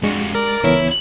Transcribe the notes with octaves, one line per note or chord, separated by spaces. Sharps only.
F2 G#3 D4 F#4
G4
A#4 D5
C#2 E3 B3 E4 C#5